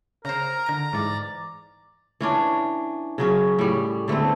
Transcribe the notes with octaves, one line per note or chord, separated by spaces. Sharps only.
C#3 A#4 C5 A#5
D3 D7
G#2 E3 D5
E3 C#4 D4
C#3 F#3 C#4
A2 G3
D3 A3 B3 C4